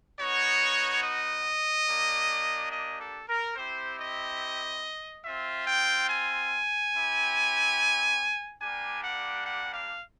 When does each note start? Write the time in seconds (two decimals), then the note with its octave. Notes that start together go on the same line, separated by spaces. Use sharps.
0.19 B3 D#4 F#4 C#5
1.04 D#5
1.88 A#3 D4 G4
2.72 D#5
3.00 A4
3.29 A#4
3.56 C4 E4 G4 C5
3.99 D#5
5.24 C4 F4 E5
5.67 G5
6.09 G#5
6.94 C4 E4 G4
8.61 G3 A#3 D4 G4 G#5
9.04 F#5
9.46 F#5
9.74 F5